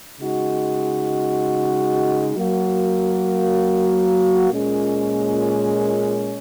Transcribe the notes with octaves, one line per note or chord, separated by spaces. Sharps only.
C#3 G#3 D#4 F#4
F#3 A#3 F#4
A#2 G#3 C#4